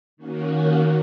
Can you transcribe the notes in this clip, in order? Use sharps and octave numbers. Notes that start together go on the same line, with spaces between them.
D#3 A#3 C#4 F#4